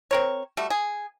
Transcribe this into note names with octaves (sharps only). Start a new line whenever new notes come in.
C4 A#4 C#5
G3 A3 F#4
G#4